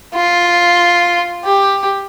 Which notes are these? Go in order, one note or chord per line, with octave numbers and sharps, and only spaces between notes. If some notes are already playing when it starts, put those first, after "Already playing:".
F4
G4